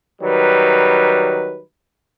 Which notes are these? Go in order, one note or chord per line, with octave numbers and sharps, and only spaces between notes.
D#3 F#3 G3 B4